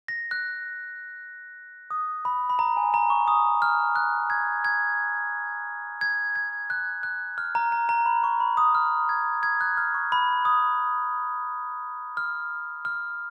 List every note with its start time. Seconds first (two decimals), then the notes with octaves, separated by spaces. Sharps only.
0.08 A#6
0.31 F#6
1.91 D#6
2.25 B5
2.50 B5
2.59 A#5
2.77 G#5
2.94 A#5
3.10 C#6
3.28 D#6
3.62 F6
3.96 F#6
4.30 G#6
4.65 G#6
6.01 G#6
6.36 G#6
6.70 F#6
7.03 F#6
7.38 F6
7.55 A#5
7.72 A#5
7.89 A#5
8.06 B5
8.24 C#6
8.40 B5
8.57 D#6
8.75 F6
9.09 G#6
9.43 G#6
9.61 F#6
9.77 F6
9.94 C#6
10.12 B5
10.45 D#6
12.17 F6
12.85 F6